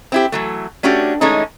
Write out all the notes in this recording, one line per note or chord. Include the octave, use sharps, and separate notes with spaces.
C4 E4 G4
E3 F#3 A3
A3 C#4 D4 F#4 G4
E3 G#3 A3 C#4 D#4